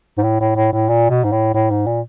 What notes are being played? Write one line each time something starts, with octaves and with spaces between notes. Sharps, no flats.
G#2
A2
A2
A2
A2
A#2
B2
G#2
A2
A2
G#2
A#2